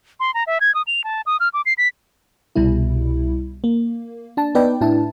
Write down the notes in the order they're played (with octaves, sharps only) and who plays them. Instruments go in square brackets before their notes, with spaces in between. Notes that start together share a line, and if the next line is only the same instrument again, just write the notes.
[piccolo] C6
A#5
E5
G#6
D#6
F7
A5
D#6
F6
D6
C7
B6
[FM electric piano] C2 B2 G3 E4
A#3
D4 A5
B3 D#4 B4 D5 G5
A2 D4 E4 A5